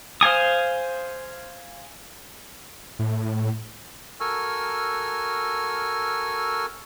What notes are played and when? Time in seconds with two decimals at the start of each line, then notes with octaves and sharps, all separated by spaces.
0.21 C5 F5 G#5 D#6
2.99 A2
4.20 F#4 A4 A#4 G#5 E6 F6